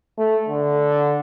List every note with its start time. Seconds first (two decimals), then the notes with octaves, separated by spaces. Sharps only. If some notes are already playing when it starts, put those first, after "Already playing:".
0.18 A3
0.48 D3